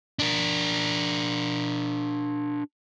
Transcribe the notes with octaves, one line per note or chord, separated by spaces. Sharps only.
D4 A#4